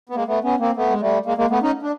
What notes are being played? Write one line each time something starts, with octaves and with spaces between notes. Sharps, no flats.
B3
G#3 A#3
A3 B3
B3 C#4
A#3 C4
A3 B3
G#3
G3 A3
G#3 A#3
G#3 A#3
A3 B3
C#4 D#4
D4